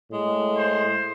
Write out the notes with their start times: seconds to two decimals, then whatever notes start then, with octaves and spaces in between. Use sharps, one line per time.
0.11 A2 G#3
0.57 C5